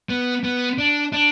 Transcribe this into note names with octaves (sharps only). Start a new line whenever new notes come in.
B3
B3
D4
D4